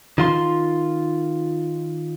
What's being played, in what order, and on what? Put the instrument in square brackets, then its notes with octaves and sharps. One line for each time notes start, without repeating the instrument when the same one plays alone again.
[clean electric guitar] D#3 F4 C6